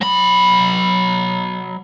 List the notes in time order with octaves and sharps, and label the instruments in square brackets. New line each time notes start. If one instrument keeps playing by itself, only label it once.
[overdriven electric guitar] F#3 B5